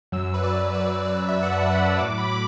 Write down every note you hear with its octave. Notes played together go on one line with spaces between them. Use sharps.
F#2 F#3 E6
B4
D5
B4
D5
E5
F#5
A5
A5
B5
B5
A2 F#3 D6
B5
D6